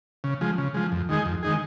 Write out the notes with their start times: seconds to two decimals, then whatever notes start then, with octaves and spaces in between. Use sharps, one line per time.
0.24 C#3
0.41 F3 G#3
0.58 C#3
0.74 F3 G#3
0.92 F2
1.09 D#3 G#3 D#4 G#4
1.26 F2
1.43 D#3 G#3 D#4 G#4